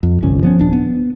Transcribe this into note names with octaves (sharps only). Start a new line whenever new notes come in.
F2
G1 C2 C#4
F3 B3 C#4
D#1 D4
B3